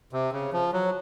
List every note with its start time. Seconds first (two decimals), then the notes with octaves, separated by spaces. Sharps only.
0.13 C3
0.32 C#3
0.53 F3
0.73 F#3